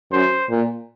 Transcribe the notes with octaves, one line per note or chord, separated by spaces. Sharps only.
F#2 C5
A#2